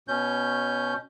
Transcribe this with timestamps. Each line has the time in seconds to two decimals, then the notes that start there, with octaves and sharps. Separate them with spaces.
0.08 B2 C#4 G6